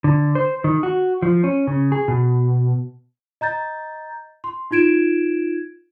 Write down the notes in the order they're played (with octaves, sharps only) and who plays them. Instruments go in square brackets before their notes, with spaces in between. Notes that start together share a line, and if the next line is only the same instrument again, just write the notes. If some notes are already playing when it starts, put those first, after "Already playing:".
[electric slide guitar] D3
C5
D#3
F#4
F3
C#4
C#3
G#4
B2
[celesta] D#5 A#5 G6 A6
C6
D#4 F4 G#6 D7 E7